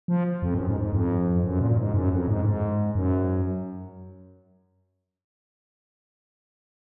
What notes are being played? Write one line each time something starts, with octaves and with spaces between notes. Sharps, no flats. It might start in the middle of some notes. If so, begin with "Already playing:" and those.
F3
F2
F#2
G#2
G#2
F2
F#2
A#2
A#2
G#2
F#2
F2
G#2
G#2
F#2